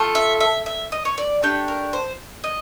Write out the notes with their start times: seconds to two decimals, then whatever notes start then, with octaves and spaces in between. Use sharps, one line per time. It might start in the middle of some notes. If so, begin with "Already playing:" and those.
Already playing: A3 F4 A4
0.15 E5
0.40 E5
0.66 E5
0.92 D#5
1.05 C#5
1.18 D5
1.42 A3 D4 G4 C#5
1.68 A#4
1.93 C5
2.44 D#5